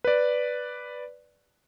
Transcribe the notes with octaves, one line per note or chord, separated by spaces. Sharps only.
B4 D5